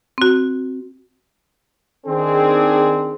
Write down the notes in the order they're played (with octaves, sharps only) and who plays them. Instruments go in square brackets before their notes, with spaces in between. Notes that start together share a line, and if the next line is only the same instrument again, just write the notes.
[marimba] C4 F#4
[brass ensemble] D#3 C4 D4 G#4